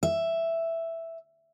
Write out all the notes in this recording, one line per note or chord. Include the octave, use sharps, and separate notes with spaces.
E5